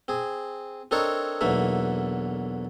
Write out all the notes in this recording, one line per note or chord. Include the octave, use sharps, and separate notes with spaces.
C4 G#4
C4 D4 D#4 A4 A#4 C#5
B1 E2 D3 A#3 E5